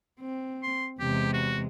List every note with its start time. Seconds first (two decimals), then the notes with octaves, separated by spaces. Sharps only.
0.20 C4
0.63 C6
1.00 E2 C3 G#3 G4
1.33 F#4